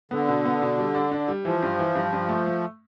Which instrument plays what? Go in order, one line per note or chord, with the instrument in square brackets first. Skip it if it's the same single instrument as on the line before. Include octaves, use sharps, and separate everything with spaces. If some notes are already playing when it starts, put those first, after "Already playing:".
[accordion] D3 [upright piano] B3
[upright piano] B2
B3
B2
G3
D4
D4
G3
[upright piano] E3 [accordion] F3
[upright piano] G2
E3
G2
G2
A3
A3